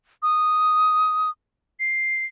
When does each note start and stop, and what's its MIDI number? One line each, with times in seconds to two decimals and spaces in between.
0.23 1.30 87
1.80 2.25 96